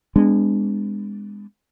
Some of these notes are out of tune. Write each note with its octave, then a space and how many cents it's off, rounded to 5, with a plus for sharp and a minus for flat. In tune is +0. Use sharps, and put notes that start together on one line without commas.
G#3 -20 B3 +30 D4 +0